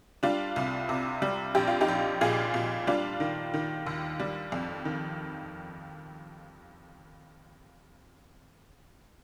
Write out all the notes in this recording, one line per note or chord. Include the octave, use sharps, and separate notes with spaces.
G3 D4 F4
C2
C3
G3
A#1 G4
F4
D#4 G4
A#1
A#2 F4 G#4
A#2
G3 D4 F4
D#3
D#3
D#2
G3
F2
D#3